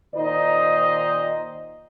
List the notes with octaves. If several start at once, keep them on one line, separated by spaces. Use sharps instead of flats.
A#2 D#3 D#4 C5 D5 D#5